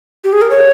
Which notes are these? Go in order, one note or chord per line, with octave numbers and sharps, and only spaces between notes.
G4
G#4
A#4
C#5